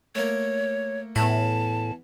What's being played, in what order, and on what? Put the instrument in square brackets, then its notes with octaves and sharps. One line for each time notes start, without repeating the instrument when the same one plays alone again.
[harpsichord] A3 A#3 [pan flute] C#5
[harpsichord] E2 B5 [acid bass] A2 [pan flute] A5